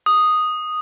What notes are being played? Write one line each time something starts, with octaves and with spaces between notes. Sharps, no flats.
D#6